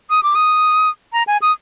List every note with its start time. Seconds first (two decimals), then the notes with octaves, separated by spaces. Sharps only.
0.10 D#6
0.23 D6
0.35 D#6
1.13 A#5
1.27 G#5
1.41 D#6